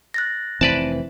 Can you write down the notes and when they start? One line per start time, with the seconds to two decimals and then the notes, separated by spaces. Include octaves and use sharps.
0.14 F#6 A6 A#6
0.61 F1 E3 C4 B4 D5 A5